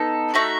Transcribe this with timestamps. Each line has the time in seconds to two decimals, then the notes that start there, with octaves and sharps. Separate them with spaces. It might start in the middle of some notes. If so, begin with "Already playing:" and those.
Already playing: B3 D#4 A4
0.34 A3 D#4 F#4 E5